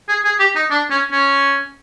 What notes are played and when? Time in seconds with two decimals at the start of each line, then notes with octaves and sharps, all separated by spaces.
0.09 G#4
0.25 G#4
0.39 G4
0.56 D#4
0.70 D4
0.90 C#4
1.12 C#4